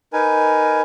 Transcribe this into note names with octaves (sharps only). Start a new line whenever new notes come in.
D#4 A#4 B4 G#5